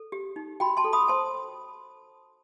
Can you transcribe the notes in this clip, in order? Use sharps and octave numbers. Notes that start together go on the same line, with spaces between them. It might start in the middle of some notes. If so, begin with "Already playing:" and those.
Already playing: A4
G4
D#4
F#4 G5 B5
A5 C6
A4
B5 D#6
C5 A5 C6